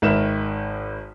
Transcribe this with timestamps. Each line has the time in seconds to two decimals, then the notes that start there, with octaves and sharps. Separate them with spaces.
0.02 G#1 D#3 B4 E5 E7